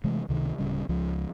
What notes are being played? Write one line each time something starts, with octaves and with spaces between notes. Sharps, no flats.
C3 E3 G#3 A3
C#2 C3 D#3
D1 C#3 G3
C#2 F3